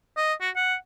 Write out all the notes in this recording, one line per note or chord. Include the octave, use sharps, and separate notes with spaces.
D#5
F#4
F#5